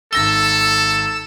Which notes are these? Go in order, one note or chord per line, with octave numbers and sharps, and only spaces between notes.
G#1 A4 E6 A#6 G7